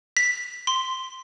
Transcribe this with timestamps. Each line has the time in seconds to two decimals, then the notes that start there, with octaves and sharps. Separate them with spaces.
0.17 B6
0.67 C6